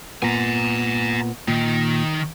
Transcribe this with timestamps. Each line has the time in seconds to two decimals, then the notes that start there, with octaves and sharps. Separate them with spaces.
0.22 A#2 B3 G#5 A#5
1.48 A#2 D#3